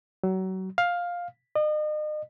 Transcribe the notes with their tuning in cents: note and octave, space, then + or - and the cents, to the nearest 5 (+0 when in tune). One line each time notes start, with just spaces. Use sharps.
F#3 +30
F5 +10
D#5 -40